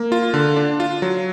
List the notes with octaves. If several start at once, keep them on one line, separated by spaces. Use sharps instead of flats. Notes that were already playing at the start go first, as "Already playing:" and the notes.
Already playing: A#3
F4
D3
D4
F4
F#3